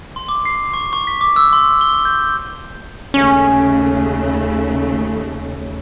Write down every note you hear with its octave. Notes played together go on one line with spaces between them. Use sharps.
C6
D6
C7
C#6
C#6
B6
D6
E6
C6
G7
G6
D#2 C#3 A3 C#4